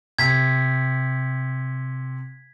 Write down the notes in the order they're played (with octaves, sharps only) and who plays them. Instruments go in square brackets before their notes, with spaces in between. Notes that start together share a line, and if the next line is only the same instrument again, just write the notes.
[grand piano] C3 [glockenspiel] G#6 B6